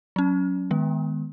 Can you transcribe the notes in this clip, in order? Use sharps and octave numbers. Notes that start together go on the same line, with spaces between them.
F#3 C#4
D#3 G#3 B3